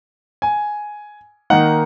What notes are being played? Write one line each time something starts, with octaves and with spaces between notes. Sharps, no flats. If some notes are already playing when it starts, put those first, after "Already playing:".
G#5
D#3 A#3 D#4 F#5